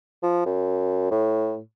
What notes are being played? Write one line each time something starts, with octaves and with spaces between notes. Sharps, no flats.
F3
F#2
A2